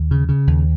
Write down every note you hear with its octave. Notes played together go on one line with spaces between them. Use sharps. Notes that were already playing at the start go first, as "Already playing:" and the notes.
Already playing: D#2
C#3
C#3
D#2